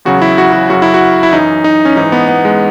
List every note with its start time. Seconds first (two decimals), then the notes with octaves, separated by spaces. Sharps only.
0.05 E2 C#3 F#3 F#4
0.22 E4
0.38 F#4
0.53 F#4
0.70 F#2 C#3 F#3 F#4
0.82 E4
0.94 F#4
1.23 E4
1.32 F#2 E3 D#4
1.64 D#4
1.85 C#4
1.96 G#2 E3 D#4
2.12 B3
2.29 B3
2.45 G#3